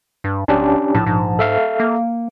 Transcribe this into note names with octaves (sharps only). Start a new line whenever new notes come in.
G2
D1 C#4 D4 G4
A#1 A2 A5
G#2
A4 E5 F5
A#3